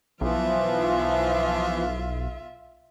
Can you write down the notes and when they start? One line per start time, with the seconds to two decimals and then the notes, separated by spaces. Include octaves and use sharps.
0.21 B1 E3 F3 F4 E5